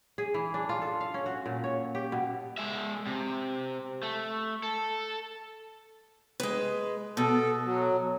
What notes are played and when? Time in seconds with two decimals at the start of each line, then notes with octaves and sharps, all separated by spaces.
0.18 G#4
0.34 E3
0.54 D4
0.69 F4
0.82 A4
1.01 F5
1.14 C#4
1.26 F#4
1.46 A#2
1.64 C#5
1.95 G4
2.12 B2
2.58 G#3 E5
3.07 C3
4.03 A3
4.63 A4
6.40 G#3 B4
7.17 B2 A4
7.65 F#3